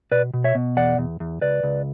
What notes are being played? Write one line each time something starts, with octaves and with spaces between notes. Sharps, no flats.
B2 B4 D5
B2
C#5 E5
B2
E2 D5 F#5
E2
E2
C#2 B4 D5
C#2